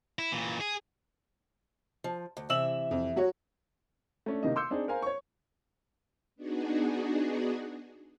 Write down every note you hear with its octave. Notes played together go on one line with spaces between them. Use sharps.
E4
A#2 E3
G#4
F3
D2
C3 E3 E5 E6 E7 F#7
F2
F#3 F#4 C#5
A3 C#4 D4
C3 D#3 A#3 D#5
C6 D6 E6 G6 C#7
C4 D4 D#4 G#4
A#4 C5 F5 G#5 A#5
C#5 C#6
B3 D4 D#4 F#4 G#4